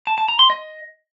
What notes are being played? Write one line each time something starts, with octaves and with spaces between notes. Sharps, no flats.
A5
A5
A#5
C6
D#5